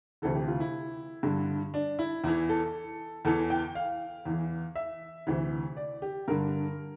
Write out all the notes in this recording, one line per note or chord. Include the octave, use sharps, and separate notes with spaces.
D2 C3 E3 A4
G4
F4
E4
G2 D3
D4
E4
E2 E3 E4
A4
E2 E3 A4
G5
F5
E2 E3
E5
D2 C3 E3
D5
G4
G2 D3 A#4